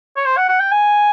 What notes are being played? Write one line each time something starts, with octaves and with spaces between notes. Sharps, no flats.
C#5
C5
F#5
F#5
G5
G#5